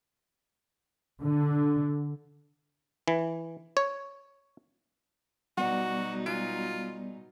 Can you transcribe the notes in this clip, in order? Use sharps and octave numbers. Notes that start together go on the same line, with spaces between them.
D3
E3
C#5
B2 F#3 G3 B3 D#4 F#4 D5 F#5
G#3 F4